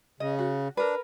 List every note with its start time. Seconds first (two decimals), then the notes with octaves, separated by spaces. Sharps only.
0.20 C#3 D#5
0.39 F#4
0.77 D4 A#4 B4